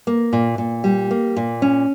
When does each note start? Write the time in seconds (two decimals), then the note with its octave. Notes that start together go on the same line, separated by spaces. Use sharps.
0.07 A#3
0.33 A#2
0.58 A#2
0.84 G3
1.11 A#3
1.36 A#2
1.62 C#4